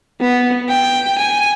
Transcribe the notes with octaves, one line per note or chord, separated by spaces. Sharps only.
B3
G5
G#5